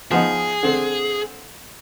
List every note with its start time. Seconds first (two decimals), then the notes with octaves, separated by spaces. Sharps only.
0.11 F3 B3 D#4 G#4
0.63 D3 C4